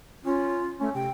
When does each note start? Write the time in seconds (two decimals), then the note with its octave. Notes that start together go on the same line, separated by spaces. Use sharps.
0.25 C#4 F4
0.80 A3 C#4
0.94 C3 G5